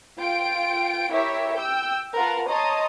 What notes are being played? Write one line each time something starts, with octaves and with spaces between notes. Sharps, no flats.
F4 G5 D7
E4 G4 A#4 C#5 E5
G5 E6 G6
F4 A#4 B4 F#5 A5 A#5
C#5 D#5 A5 A#5 C6 D#6